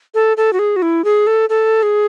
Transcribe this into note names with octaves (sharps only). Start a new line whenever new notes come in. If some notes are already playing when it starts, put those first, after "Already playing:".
A4
A4
F#4
G#4
F#4
E4
G#4
A4
A4
G#4